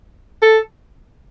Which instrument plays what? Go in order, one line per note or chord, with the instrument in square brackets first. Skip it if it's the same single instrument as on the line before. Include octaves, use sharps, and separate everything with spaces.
[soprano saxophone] A4